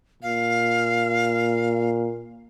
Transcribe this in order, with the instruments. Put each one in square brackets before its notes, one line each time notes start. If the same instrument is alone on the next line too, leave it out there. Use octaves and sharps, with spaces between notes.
[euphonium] A#2 [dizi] F5